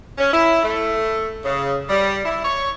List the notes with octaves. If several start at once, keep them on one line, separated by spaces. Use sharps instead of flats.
C#4
E4
A3
C#3
G3
E4
C#5